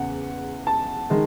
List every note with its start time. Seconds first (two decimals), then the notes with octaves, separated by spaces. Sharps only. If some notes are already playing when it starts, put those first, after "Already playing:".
Already playing: E2 C#3 F#5
0.67 A5
1.10 D#3 G#3